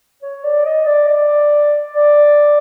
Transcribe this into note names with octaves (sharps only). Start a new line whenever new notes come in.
C#5
D5
D#5
D5
D5
D5